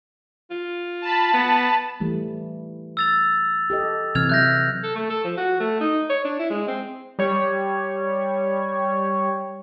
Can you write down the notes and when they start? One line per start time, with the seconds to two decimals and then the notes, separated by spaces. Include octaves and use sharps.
0.51 F4
1.02 A5 B5
1.34 B3
2.00 E3 G3 A3
2.97 E6 A6 F7
3.70 G4 A4 D#5
4.15 C3 E3 C4 F6 G#6 F7
4.29 F#3 E5 F#6 G6 A#6
4.84 A4
4.95 A3
5.10 A4
5.24 F3
5.37 F#4
5.60 A3
5.81 D#4
6.10 C#5
6.25 D4
6.39 E4
6.51 G#3
6.68 C4
7.19 G3 C#5